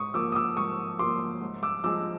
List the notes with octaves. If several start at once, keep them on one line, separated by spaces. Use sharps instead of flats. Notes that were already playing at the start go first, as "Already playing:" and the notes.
Already playing: G#2 C#6 D#6
F3 A#3 D6 E6
D#6
D6 E6
G#2 C#6 D#6
F3 A#3 C6 D6
G#2
D6 E6
F3 G#3 D6 E6